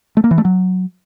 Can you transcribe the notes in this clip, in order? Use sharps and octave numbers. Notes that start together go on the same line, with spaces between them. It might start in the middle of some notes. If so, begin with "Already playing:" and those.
A3
A#3
E3
A3
F#3